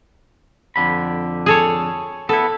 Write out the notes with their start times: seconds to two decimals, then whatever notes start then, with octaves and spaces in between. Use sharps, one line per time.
0.76 F2 D3 B5
1.46 G#4 A4 C#5
2.29 B3 E4 A4